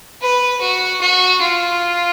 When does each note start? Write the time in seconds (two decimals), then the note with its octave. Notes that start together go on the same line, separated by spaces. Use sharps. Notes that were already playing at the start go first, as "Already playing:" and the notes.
0.21 B4
0.62 F#4
1.01 F#4
1.41 F4